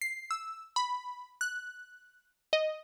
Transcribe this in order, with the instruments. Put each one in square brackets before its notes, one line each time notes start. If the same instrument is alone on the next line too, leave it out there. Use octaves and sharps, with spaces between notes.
[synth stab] C7
E6
B5
F#6
D#5